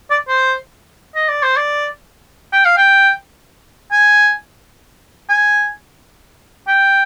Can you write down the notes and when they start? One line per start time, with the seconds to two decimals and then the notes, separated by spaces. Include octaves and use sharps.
0.10 D5
0.28 C5
1.15 D#5
1.29 D5
1.43 C5
1.56 D5
2.53 G5
2.65 F5
2.77 G5
3.91 G#5
5.29 G#5
6.67 G5